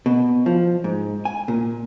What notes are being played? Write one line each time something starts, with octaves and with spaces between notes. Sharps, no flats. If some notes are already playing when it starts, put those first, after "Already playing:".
B2
F3
G#2
G#5
A#2